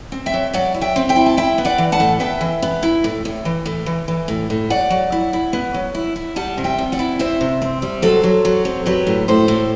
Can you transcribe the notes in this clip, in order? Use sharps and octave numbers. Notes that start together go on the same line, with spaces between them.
C4
E5 G5
F#3
F#3 D5 F#5
E4
E5 G5
C4
E5 G5
E4
A5
E4 E5 G5
B3
D5 F#5
E3
F#5 A5
A2
B3 E5 G5
E3
B3
E4
A2
A2
E3
A2
E3
E3
A2
A2
F#3 D5 F#5
F#3
E4
E4
B3
F#3
E4
E4
G3 F#5 A5
C3
E5 G5
C3
D5 F#5
E4
C4 C5 E5
C3
C4
G3
F#3 A4 C5
F#3
F#3
C4
F#3 G4 B4
A2
A2 A4 C5
A2